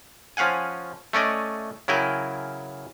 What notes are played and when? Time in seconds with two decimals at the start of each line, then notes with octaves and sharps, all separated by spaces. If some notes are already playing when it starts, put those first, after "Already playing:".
0.37 F3 C#4 F5 F#5 G#5
1.13 A3 C#4 D5 D#5
1.88 C#3 F#3 E4 A#4 G5 G#5